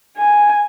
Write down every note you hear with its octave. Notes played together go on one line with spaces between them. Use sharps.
G#5